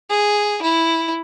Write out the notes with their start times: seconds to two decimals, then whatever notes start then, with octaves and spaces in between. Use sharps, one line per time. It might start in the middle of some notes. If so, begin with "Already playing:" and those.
0.10 G#4
0.62 E4